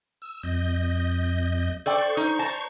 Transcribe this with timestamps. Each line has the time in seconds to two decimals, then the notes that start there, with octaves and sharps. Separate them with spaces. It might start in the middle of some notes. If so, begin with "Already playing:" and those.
0.22 E6
0.43 F2 D#5 G6
1.86 A4 C5 D5 G5 C#6
2.17 D#4
2.39 A5 A#5